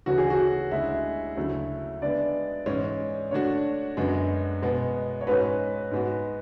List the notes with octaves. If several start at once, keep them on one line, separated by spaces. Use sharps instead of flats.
D2 C#3 E3 A3 C#4 F#4
G#4
F#4
D2 D3 G#3 C#4 E4 E5
D2 C#3 F#3 A3 E4
D3 G#3 B3 D5
G#2 E3 G#3 C#4
D3 A3 D4 F#4 C#5
F#2 D3 G#3 B3 F#4
B2 G#3 B3
C#5
G#2 G#3 C#4 F#4 B4
G#2 G#3 B3 F#4